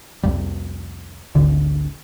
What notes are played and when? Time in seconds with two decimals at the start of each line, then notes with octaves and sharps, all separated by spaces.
0.23 C2 F2 G3
1.35 G#1 D2 D3